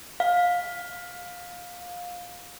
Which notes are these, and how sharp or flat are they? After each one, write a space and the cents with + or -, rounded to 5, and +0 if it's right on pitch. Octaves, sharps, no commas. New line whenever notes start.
F5 +20